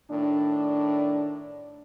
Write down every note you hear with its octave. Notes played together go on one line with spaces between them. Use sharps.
A2 D#3 D4